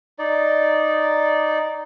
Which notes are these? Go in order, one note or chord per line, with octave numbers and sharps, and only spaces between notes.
D#4 D5